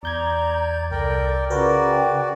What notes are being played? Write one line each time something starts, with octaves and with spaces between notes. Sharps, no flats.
E2 D5 A#5 G6 G#6
C2 A4 A#4 D5 G5
C#3 F4 F#4 A#4 B4 D5
G5